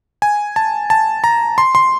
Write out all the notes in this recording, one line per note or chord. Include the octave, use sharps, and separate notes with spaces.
G#5
A5
A5
A#5
C6
C6